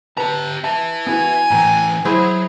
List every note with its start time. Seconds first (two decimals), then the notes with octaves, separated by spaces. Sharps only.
0.17 G4 B4 A5 A#5
0.64 B4 E5 A5
1.07 B3 E4 F#4 G#5
1.51 A2 E3 G5 A#5
2.05 F#3 E4 G#4 C5 F#5